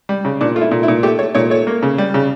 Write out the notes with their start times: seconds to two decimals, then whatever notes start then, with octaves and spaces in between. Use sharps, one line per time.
0.09 G3
0.25 C#3
0.41 A#2 D4
0.56 A3 F4
0.61 E4
0.71 A#2
0.83 E4
0.88 A#2
1.03 A3 G4
1.19 A3 C#5
1.35 A#2 C#5
1.50 A3 C#5
1.67 A#3
1.83 C#3
1.98 G3
2.14 C#3